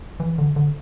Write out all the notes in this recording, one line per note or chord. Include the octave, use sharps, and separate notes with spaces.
E3
D3
D3